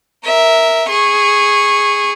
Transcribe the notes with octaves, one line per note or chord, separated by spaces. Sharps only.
A#4 E5
G#4 C#6